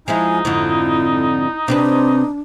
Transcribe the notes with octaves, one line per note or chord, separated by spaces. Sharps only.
F3 G#3 D#4 E4 G#5
F2 G#2 D3 E4
C3 C4 D4 B4